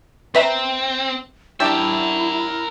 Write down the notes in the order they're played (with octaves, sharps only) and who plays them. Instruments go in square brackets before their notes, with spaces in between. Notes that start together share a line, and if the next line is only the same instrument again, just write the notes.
[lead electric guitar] C4 [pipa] B4 E5 A#5
[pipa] G3 D4 G4 [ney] E4 [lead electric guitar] A#4 E5